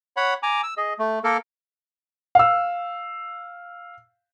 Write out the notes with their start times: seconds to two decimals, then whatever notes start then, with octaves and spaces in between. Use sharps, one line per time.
0.17 C#5 F#5 B5
0.43 G#5 A#5 D6
0.63 E6
0.77 G#4 D#5
0.99 A3
1.24 A#3 A4 A#4
2.35 F5 E6